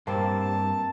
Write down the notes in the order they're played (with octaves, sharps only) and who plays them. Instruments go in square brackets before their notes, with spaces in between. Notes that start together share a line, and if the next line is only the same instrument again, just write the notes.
[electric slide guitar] G2 [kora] A#3 C4 [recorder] A5